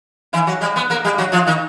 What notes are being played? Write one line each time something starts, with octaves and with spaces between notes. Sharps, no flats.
E3 E4
F#3 F#4
G3 G4
B3 B4
A#3 A#4
G3 G4
F#3 F#4
F3 F4
D#3 D#4